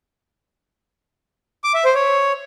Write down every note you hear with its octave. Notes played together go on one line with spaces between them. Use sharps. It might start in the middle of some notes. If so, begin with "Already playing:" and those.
D6
E5
C5
C#5